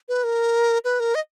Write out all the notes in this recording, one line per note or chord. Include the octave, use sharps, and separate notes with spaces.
B4
A#4
B4
A#4
D#5